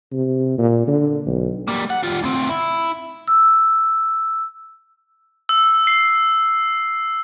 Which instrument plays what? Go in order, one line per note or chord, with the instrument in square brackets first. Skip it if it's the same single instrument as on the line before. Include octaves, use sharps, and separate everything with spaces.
[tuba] C3
A#2
D3
B1
[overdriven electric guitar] G3 A#3
F#5
G3 F4
D2 C4
E4
[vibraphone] E6
[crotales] E6
C7